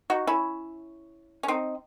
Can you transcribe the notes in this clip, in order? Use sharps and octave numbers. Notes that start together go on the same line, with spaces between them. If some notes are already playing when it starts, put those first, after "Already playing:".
D#4 F#4
C#4 E4
C#4
C4 D#4